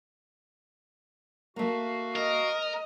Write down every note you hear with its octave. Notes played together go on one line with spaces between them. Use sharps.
A3 A#3 F#4 F5
A#4 D#5